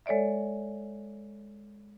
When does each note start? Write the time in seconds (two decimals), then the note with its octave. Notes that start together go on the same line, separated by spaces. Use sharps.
0.06 G#3 A4 C#5 D5 E5